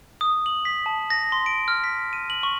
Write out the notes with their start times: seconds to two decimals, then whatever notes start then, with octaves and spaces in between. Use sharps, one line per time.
0.21 D#6
0.46 F#7
0.65 B6
0.86 A5
1.10 A#6
1.32 C6
1.46 D7
1.68 F6
1.84 B6
2.13 D#7
2.30 F#7
2.43 C#6